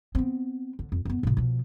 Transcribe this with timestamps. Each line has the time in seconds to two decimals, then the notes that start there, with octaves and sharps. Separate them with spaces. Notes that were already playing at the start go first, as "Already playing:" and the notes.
0.15 B3 C4
0.79 D3
0.92 F2
1.05 F#2 B3
1.23 A2 C#3
1.37 B2 F3